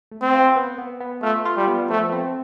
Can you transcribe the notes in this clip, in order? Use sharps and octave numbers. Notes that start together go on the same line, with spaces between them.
A3
C4
F4
B3
B3
B3
A3 F4
F4
G3
B3
F3 A3
C4